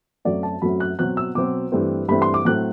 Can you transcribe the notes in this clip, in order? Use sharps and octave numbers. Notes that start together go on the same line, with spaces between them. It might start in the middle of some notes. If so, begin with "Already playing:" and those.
F#2 F#3 A3 C4 D5
A5
F#2 F#3 A3 C4 B5
F#6
B2 F#3 C4 F#6
E6
B2 F#3 C4 D6
G2 E3 A3 C4
G2 E3 A3 C4 B5
C6
D6
A2 F#3 A3 C4 F#6